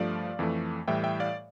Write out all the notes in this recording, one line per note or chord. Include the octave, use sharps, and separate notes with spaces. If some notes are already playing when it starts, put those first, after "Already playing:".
Already playing: G2 F3 A3 D5 F5
F2 E3 A3
A2 E3 G3 E5 G5
E5 G5
D5 F5